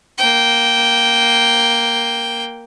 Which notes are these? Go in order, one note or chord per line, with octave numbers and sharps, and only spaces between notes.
A#3 G5